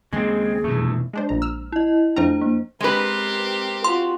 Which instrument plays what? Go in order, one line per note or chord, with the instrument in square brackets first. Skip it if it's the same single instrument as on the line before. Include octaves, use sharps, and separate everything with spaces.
[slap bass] D#2 C#3 [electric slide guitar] G#3 C4 [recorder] G#4
[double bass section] F1 B2 E3 [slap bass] E2 G2 [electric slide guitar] A3
[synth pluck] G#3 D4 C5
A#1 A#5
E6 F6
[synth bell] E4 D#5
[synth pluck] F2 A3 A#5 [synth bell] D4 C5
[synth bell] A#3
[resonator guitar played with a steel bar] G#3 B4 [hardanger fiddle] C4 G4 [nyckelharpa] A#4 C6
[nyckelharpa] F4 F#4 [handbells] C6